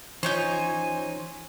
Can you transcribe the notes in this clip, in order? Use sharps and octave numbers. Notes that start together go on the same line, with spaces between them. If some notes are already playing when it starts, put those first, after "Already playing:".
E3 C#4 D#4 F4 C5 C#5 G#5 G6